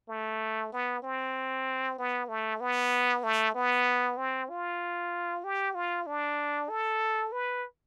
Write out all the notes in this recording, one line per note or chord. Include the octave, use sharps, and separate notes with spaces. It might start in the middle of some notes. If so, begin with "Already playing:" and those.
A3
B3
C4
B3
A3
B3
A3
B3
C4
F4
G4
F4
D4
A4
B4